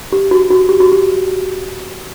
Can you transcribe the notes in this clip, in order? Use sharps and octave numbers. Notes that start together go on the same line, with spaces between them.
G4
F#4
F#4
G4
F#4
G4